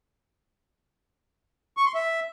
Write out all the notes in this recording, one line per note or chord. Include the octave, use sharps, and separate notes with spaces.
C#6
C6
E5